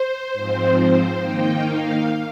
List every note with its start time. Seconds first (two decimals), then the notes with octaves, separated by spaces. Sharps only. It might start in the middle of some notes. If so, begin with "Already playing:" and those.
Already playing: C5
0.33 G#2 F3 C4
0.76 C5
1.18 D#3 A#3 D#4 G5
1.61 F5